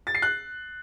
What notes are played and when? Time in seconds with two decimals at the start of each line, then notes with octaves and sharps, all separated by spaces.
0.07 A6
0.15 C7
0.22 F#6